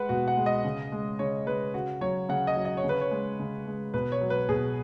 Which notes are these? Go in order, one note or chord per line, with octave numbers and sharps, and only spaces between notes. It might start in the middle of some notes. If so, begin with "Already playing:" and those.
Already playing: G#3 B4 F#5
B2 F#4
F#5
G#3
D#5
C#3
G#3
C#3 C#5
G#3 B4
C#3 F#4
F#3 C#5
C#3 F#5
D#5
F#3
D#5
C#5
C#3
B4
C#5
G#3
C#3
G#3
B2 B4
C#5
F#3
B4
B2 G#4